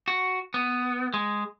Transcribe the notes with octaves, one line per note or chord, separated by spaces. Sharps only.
F#4
B3
G#3